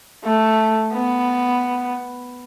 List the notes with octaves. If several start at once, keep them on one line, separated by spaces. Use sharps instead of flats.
A3
B3